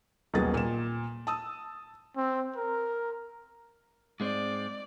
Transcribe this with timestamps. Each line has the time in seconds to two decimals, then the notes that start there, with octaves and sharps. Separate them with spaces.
0.34 D#1 B1 A#3 B3 G#4 A6
0.54 A#2 E7
1.27 A5 D#6 E6
2.17 C4
2.56 A#4
4.20 G#2 G#3 C4 D5